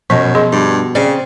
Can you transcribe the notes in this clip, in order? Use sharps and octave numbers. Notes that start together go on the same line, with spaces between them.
F#2 B2 F3 D#5
G#4 D#5 C6
G2
C#3 C4 D5